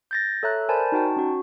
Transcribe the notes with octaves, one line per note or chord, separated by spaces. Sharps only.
G6 A6 A#6
A4 C#5 E5 A#5 F#6
A#4 C5 D5 G#5 A5 B5
D#4 F#4 G5 A5
C#4 F#4